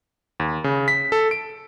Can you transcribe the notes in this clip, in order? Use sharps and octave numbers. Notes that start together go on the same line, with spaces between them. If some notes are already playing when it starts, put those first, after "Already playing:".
D#2
C#3
B6
A4
D7